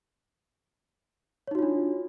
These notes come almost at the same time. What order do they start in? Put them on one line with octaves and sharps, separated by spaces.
C#5 D#4 F#4 F4 D4